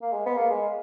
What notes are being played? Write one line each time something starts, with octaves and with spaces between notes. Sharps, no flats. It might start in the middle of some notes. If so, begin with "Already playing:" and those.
A#3
G#3
B3
A#3
G#3